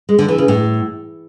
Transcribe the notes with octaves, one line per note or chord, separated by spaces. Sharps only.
G#3
D3
E3
C#3
A2